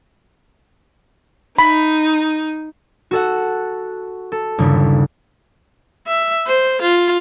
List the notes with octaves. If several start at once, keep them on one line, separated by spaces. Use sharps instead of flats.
D#4 B5
F#4 A4 F#5
A4
G1 D#2 C#3
E5
C5
F4